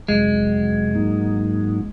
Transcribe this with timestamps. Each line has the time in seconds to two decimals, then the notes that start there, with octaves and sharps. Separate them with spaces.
0.08 F2 C3 F#3 G#3
0.95 G#2 F#3 A#3 D#4